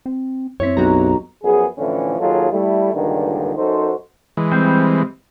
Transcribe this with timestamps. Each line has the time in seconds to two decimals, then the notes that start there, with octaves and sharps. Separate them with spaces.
0.06 C4
0.60 F#2 C4 E4 C#5 C#6 B6
0.77 B1 F#4 G4 A#5
1.44 F#2 F3 B3 G#4
1.78 A2 D3 E3 F3 C#4
2.19 D#2 F#3 D#4 F4 G#4 A4
2.52 G3 A3 E4
2.94 C#2 G2 A#2 D3 D#3
3.57 F#2 D#4 F#4 A4 C5
4.37 E3 G#3
4.52 G3 C4